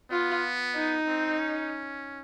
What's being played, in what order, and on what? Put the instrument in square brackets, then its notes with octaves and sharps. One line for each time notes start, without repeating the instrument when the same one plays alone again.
[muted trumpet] B3 [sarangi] F4
[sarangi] D#4
[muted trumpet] C4
C#4